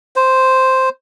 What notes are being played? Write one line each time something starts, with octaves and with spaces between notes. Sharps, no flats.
C5